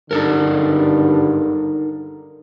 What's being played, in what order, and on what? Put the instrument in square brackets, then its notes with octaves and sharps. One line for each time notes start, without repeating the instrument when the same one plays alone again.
[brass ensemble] G#1 G2 D3 [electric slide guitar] D#4 A4 A#4